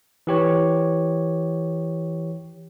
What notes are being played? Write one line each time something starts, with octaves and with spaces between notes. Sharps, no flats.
E3 G4 C#5